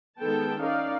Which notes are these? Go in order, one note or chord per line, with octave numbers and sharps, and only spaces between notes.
D#3 G#3 B3 A4 G5 A5
C#4 D#4 A#4 D5 F5